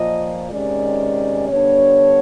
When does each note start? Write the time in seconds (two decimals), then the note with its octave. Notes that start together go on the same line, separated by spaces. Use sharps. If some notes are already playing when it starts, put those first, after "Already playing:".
Already playing: A#2 F3 A#3 D#5
0.49 C3 D#3 G#3 C#4 D5
1.49 D3 G3 B3 D4 C#5